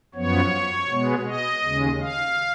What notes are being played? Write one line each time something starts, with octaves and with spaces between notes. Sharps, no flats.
F#2 F3 B3 C#5
B2 G#3 B3
D#5
D#2 C#3 G#3
F5